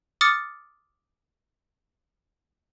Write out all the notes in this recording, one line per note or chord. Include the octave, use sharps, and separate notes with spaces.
D6 D#6 F6 A6 C#7